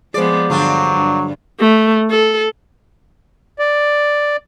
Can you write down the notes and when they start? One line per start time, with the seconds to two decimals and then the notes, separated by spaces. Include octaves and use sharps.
0.14 F3 G#3 B3 G#4 C5 D5
0.50 G2 D3 F#3 C4 D4 F4
0.93 G2
1.60 A3
2.10 A4
3.59 D5